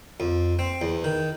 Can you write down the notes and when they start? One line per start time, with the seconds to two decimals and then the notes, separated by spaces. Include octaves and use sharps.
0.20 F2
0.59 C4
0.82 E2
1.04 D#3